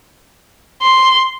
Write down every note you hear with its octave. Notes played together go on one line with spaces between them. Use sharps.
C6